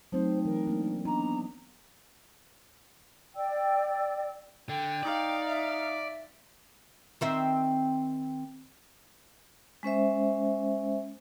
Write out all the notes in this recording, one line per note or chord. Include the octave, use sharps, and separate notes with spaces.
F#3 A3 C4 D#4 C5
E3 A#4
A#3 D4
B3 D4 D#4 A#5
D5 G5 E6
D3 G5
D#4 D5 F5
E5
D#3 C4 E5
G#3 C#4 C5 E5